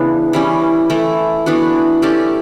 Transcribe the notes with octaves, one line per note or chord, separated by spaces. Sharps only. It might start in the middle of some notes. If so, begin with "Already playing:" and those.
Already playing: C#3 E3 B3 D4
E3 G3 C#4
E3 A3 E4
E3 B3 D4 F#4
A3 C#4 G4 D5